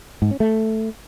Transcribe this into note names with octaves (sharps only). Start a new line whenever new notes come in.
G#2
C#4
A3